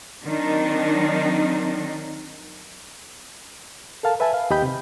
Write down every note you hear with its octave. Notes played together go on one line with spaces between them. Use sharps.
D#3 F#3 C4 D4 D#4
A4 A#4 F5 A5
B4 E5 G#5 A5
F5
D#2 G4 D#5 G5 B5 G6
C3